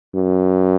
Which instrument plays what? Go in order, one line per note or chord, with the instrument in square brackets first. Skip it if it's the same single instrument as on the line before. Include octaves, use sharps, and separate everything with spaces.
[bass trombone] F#2